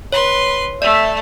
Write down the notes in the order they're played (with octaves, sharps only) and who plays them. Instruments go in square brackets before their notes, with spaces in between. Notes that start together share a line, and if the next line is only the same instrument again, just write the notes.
[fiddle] B4 C6 [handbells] C#5
[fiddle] A3 [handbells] D5 [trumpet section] E5